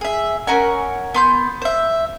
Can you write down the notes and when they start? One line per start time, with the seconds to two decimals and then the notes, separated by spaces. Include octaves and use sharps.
0.01 G#4 E5
0.47 C#4 A#4 F#5 G#5
1.14 B3 C6 G6
1.62 C5 E5